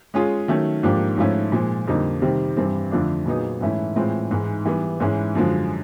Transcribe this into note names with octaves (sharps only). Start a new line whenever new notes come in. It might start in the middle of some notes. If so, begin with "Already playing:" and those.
G#3 C#4 F4 G#4
D#3 F#3 A3 C#4
G#2 F3 A#3 D4 G4
G#2 F3 A3 C#4 E4
A#2 F3 G#3
F2 D3 G3 A#3 D#4
C3 D#3 G3 C4
G2 E3 G3 C4
F2 D3 F3 A3 D4
A#2 F#3 B3 D#4 G#4
G#2 E3 A3 C#4 E4
A2 E3 G#3 C4 F4
G#2 E3 G#3
E3 G3 B3
G#2 E3 G#3 C#4 E4
F#2 D3 F3 G#3